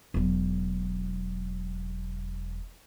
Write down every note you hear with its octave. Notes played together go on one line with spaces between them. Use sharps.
E1 F#3